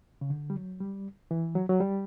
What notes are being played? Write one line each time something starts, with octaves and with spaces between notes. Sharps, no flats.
C#3
D3
G3
F#3
G3
E3
F#3
F#3
G3